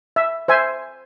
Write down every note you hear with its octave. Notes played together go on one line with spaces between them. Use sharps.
E5
C5 E5 G#5